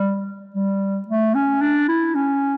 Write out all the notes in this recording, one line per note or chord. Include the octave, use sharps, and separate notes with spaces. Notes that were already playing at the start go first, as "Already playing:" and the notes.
Already playing: G3
G3
A3
C#4
D4
E4
C#4